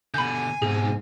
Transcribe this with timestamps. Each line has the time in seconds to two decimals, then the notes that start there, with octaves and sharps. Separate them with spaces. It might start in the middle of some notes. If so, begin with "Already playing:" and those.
0.14 B2 D3 G#5 B5 G6
0.62 G#2 B2 C4 G#4